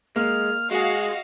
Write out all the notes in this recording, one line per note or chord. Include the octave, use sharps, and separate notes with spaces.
G#3 A#3 F6
G#3 F#4 G#4 D#5 F5